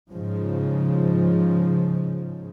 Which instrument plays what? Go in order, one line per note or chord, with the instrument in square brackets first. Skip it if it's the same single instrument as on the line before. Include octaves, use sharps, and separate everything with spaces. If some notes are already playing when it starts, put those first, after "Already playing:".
[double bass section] G#2 C#3 F3